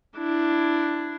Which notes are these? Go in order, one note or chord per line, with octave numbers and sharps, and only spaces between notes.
D4 E4